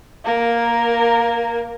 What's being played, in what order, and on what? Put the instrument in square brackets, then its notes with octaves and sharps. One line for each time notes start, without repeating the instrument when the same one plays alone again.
[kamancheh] A#3 A#4